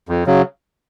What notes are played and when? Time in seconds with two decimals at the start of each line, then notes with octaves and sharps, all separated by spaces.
0.09 F2
0.27 C#3 F#3